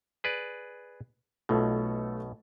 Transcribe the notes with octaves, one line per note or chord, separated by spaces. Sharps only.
G#4 B4 D5
B1 B2 A3 F4 A4